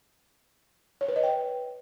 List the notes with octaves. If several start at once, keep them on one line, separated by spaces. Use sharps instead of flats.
C#5
B4
D#5
G5